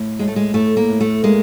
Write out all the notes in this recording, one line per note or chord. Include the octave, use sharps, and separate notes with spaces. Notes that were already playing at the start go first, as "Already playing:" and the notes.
Already playing: A2
A2 G#3
A3
G#3
A2 A3
A#3
A2
A3
G#3 A#3